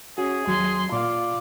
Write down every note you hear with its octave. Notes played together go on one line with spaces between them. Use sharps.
C#4 F#4 G#4
D#2 F#3 C6 G#6
A#2 F4 D5 F5